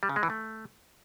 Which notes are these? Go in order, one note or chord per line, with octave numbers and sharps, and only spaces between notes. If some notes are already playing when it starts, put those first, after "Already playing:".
G3
C#3
G#3
E3
A3